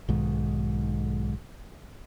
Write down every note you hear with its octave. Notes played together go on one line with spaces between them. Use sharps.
B1 G#2 D#3